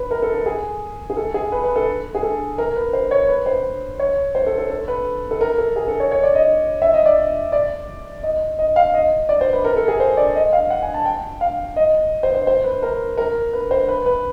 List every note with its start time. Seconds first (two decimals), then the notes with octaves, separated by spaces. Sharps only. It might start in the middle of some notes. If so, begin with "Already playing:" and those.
Already playing: B4
0.11 A#4
0.22 A4
0.34 A4
0.46 G#4
1.10 G#4
1.17 A4
1.34 G#4
1.52 B4
1.64 B4
1.76 A4
2.15 G#4
2.23 A4
2.58 A#4
2.76 B4
2.93 C5
3.11 C#5
3.29 B4
3.46 C5
3.99 C#5
4.35 C5
4.47 A4
4.58 A4
4.70 A4
4.88 B4
5.31 A4
5.41 A#4
5.58 A4
5.76 G#4
5.88 A4
6.00 C#5
6.11 C#5
6.23 D5
6.35 D#5
6.82 E5
6.94 D#5
7.06 D5
7.52 D5
8.23 D#5
8.59 D#5
8.76 F5
8.94 D#5
9.29 D5
9.41 C5
9.53 B4
9.64 A#4
9.76 A4
9.88 G#4
10.00 C5
10.17 D5
10.35 D#5
10.53 F5
10.70 F#5
10.83 G#5
10.94 A5
11.05 G5
11.41 F5
11.76 D#5
12.23 C5
12.35 C5
12.47 C5
12.64 B4
12.82 A#4
13.18 A#4
13.53 B4
13.71 C5
13.89 B4
14.06 B4